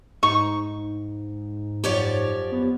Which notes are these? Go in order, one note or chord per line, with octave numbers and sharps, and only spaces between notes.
G#2 D#4 C#6
F#2 F3 G4 C#5 D5
B3